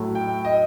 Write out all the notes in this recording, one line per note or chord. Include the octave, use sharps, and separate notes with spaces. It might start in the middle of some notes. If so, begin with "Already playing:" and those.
Already playing: A2 F#3 A3
G5
D#5